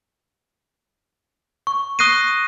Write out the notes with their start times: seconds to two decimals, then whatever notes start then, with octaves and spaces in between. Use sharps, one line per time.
1.67 C#6
1.99 C#6 D#6 F#6 A#6 C7 D#7